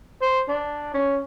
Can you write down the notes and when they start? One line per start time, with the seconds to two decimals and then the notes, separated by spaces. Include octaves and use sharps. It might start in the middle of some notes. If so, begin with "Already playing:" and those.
0.22 C5
0.49 D4
0.94 C#4